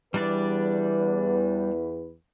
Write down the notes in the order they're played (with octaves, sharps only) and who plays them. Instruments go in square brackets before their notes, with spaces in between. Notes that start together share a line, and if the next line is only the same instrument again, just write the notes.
[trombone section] E2 B4 [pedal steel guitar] G3 D4 D5